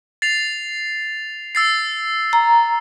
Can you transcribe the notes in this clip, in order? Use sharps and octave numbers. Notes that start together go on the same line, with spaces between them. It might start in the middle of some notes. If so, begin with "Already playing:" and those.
A6 C7 F7
E6 A6 C7
A#5